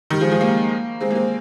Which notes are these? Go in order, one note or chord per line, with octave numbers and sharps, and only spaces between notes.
D#3 G3
F3 G#3
F3 G#3
G3 A#3
G#3 C4
A#3
G#3 C4